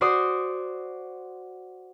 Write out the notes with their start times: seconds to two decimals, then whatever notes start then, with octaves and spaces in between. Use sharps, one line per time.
0.01 F#4 C5 D5 C6 D#6